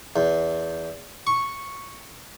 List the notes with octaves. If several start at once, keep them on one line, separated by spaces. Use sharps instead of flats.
E2
C#6